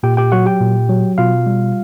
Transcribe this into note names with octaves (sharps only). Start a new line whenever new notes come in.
A#2 G4 G5
G4 G5
F#3 F#4 F#5
G4 G5
A#2
F#3
B2 F4 F5
G3